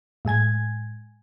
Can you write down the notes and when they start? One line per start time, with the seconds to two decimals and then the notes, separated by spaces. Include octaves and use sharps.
0.25 A2 G#3 G#5 G#6